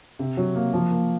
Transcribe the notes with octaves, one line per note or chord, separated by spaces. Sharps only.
C3
F#3
A#3
F3
A#3